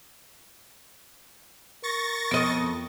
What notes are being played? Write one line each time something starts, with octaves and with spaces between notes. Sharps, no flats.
A#4 C#6 A6 A#6
F2 B3 D#5